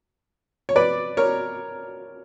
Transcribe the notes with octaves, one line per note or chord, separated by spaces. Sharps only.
C#5
B4 D5
A#4 C#5